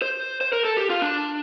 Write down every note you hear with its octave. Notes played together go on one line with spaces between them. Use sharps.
C5
C5
A#4
A4
G4
F4
D4